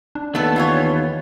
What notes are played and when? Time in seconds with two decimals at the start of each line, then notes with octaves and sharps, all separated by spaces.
0.15 D4
0.35 D#2 A3 B3 A4
0.56 E3 F4 C#5